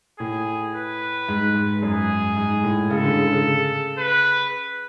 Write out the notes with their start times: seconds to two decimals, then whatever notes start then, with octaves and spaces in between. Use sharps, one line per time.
0.19 A2 G#4
0.74 B4
1.29 G#2
1.56 G#2
1.83 F#2 G#4
2.36 G#2
2.64 A2
2.90 C#3 A4
3.04 D3
3.18 C#3
3.32 C#3
3.99 B4